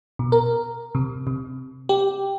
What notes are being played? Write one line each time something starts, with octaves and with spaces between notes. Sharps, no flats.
B2
A#4
C3
C3
G4